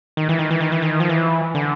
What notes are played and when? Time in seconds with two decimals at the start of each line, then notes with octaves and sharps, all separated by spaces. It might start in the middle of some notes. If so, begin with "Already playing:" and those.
0.17 D#3
0.29 E3
0.39 D#3
0.51 E3
0.61 D#3
0.72 E3
0.82 D#3
1.00 F3
1.09 E3
1.55 D3